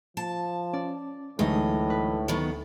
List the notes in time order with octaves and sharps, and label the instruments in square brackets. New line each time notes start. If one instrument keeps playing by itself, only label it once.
[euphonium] F3 [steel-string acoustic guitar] A5
[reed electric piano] C#4 [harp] D5
[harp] D2 [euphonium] A2 [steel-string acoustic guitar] E3 F#3 D#5 [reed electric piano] G#3 A3 D#4
[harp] B4
[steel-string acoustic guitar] D#3 F#3 B3